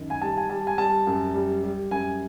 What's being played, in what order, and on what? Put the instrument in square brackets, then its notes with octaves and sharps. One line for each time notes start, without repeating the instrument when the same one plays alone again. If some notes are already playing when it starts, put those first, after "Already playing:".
Already playing: [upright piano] F#2 D#3
G#5
G3 A5
G#5
G3 A5
G#5
G3 A5
F#2
G3
G3
F#2 G#5